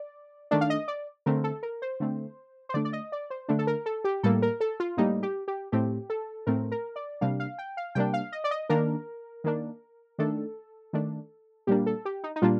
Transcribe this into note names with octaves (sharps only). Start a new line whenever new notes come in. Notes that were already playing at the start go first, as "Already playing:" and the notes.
Already playing: D5
D#3 A3 D4 D5
F5
D#5
D5
D3 A3 C4 A#4
A4
A#4
C5
D3 A3 C4
C5
D3 A3 D4 D5
D5
D#5
D5
C5
D3 A3 D4
A4
A#4
A4
G4
A2 G3 A#3 A4
A#4
A4
F4
A2 G3 A#3 D#4
G4
G4
A2 A3 C4 G4
A4
A2 A3 C4 A#4
A#4
D5
C3 G3 A#3 D4 F5
F5
G5
F5
C3 G3 A#3 D4 G5
F5
D#5
D5
D#5
D#3 A#3 D4 A#4
D#3 A#3 D4
D#3 A3 D4 A4
D#3 A3 D4
A#2 G3 A#3 D4 G4
A4
G4
D#4
D#4
A#2 G3 A#3 D4 F4